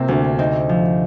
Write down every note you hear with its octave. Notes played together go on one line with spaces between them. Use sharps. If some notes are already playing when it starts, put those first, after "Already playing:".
Already playing: C3 A#3 C4
D2
C4 D#4
F3